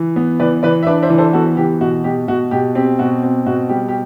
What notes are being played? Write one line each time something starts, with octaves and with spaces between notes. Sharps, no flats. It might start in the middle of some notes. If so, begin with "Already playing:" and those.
Already playing: E3
B3
E3 B4 D5
E3 B4 D5
E5
D4 B4 D5
C5 E5
E3
A4 C5
B3 F#4 A4
E3 G4
B2 F#4
B2 G4
B2 F#4
B2 G4
C4 G4
B2 F#4
C4
B2 F#4
G3 G4
G4